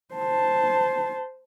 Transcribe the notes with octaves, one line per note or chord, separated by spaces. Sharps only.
C5 A5